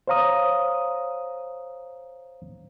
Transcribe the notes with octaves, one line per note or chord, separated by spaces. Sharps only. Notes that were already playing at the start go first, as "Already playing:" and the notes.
C5 C#5 F5 A#5 D#6